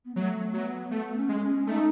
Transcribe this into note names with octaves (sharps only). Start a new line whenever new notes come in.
B3
F#3 A3
F#3 B3
A3 B3
C#4
G#3
C#4
A3 D#4